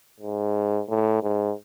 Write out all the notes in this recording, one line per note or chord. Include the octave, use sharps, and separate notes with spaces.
G#2
A2
G#2